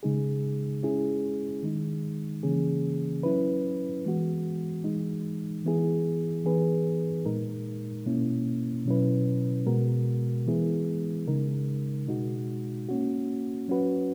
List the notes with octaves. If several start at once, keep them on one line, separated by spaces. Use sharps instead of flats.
C#3 G#3 D#4 G#4
G#3 C#4 E4 G#4
D#3 G#3 D#4
C#3 E3 A#3 C#4 G#4
F#3 C#4 E4 B4
E3 G#3 B3 F#4
E3 G#3 D#4
E3 B3 E4 G#4
E3 B3 D#4 G#4 B4
A#2 G#3 D#4 A#4
B2 A#3 C#4 E4
B2 F#3 C#4 E4 B4
B2 G#3 B3 F#4 A#4
E3 G#3 B3 E4 G#4
C#3 G#3 D#4 A#4
B2 G#3 D#4 F#4
A#3 C#4 F#4
F#3 C#4 F#4 B4